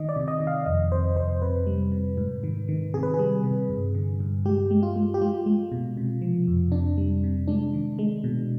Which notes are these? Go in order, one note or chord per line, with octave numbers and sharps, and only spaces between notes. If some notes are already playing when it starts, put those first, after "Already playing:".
Already playing: D#3 D#5
D5
C3
D#5
D#3
F5
F2 D#5
C3 C5
F2 C5
C3 B4
G3
C3
G#2
D#3
D#3
C3 G#4
B4
G#4
G3
C3
G2
D3
G2
G#3 G4
G#3
F4
G#3
G4
G#3 F4
G#3
B2
C3
F3
F2
C3 D4
G3
C3
G#3 D4
D#3
G#3
B2